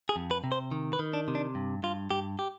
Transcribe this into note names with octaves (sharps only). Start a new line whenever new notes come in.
G#4
F2
B4
C3
C5
D#3
B4
D#3
D4
C3
D4
G2
G2 F4
G2 G4
G4